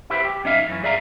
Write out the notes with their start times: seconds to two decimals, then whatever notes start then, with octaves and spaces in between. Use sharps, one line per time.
0.10 E4 G4 B4 C5
0.25 G4
0.44 F#2 C#4 D#4 E5 F5
0.68 F#2 E3 C#4
0.83 G2 G#4 D5 E5 F5 A#5